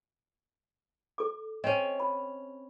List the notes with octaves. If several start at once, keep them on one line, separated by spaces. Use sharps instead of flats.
A4 D6
C4 C#4 D#5
B5